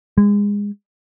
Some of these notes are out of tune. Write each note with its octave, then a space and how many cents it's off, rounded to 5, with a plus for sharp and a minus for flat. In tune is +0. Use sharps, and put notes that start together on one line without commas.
G#3 -25